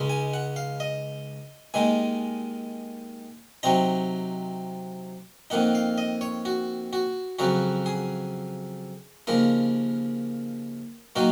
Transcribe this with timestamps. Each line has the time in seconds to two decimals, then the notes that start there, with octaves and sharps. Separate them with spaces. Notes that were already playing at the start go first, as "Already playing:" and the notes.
Already playing: C#2 C#3 G#3 D#4
0.09 G#5
0.34 F#5
0.56 F5
0.80 D#5
1.74 D#2 D#3 G#3 D#4 G#5
3.63 C3 F#3 C4 D#4 A#5
5.50 F2 D#3 A#3 D#4 F#5
5.75 F5
5.98 D#5
6.21 C#5
6.45 F#4
6.93 F#4
7.39 F2 C#3 F#3 F#4
7.86 G#4
9.27 D#2 C#3 F3 A#3 A#4
11.16 D#3 F#3 A#3 D#4 F#4